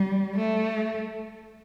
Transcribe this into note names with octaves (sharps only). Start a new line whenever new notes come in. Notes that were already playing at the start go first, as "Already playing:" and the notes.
Already playing: G3
A3